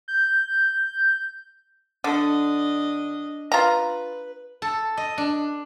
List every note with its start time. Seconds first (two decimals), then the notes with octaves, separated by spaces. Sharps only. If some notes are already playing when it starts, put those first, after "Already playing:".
0.08 G6
2.04 D3 D4 D#5
3.52 F4 B4 A#5
4.62 A4
4.97 D#5
5.18 D4